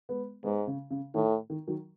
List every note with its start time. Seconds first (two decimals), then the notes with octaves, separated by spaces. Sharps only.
0.09 G#3 B3
0.43 G#2 G#3 B3
0.67 C#3
0.91 C#3
1.14 A2 D#3
1.50 D#3
1.67 D#3 F#3